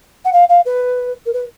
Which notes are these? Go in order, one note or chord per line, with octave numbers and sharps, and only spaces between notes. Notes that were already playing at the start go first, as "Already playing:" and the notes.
F#5
F5
F5
B4
A#4
B4